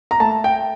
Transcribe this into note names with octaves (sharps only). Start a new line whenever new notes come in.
A#5
A3 A5
G5